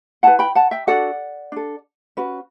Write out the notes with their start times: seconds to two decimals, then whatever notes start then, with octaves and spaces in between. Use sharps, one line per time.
0.23 E4 B4 F#5 A5
0.39 G5 B5
0.55 F#5 A5
0.71 E5 G5
0.87 D4 F#4 A4 D5 F#5
1.52 D4 A4
2.17 C#4 F#4 B4